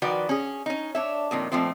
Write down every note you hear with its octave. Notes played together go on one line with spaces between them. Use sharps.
D#3 F3 F#4 B4 D5 G5
C#4 G#4
C#4 D#4
D4 C#5 E5
F2 A#2 D#3
F2 A#2 F3 A3 C4